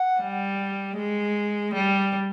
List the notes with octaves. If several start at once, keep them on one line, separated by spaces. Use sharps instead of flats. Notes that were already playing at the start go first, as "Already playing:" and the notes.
Already playing: F#5
G3
G#3
G3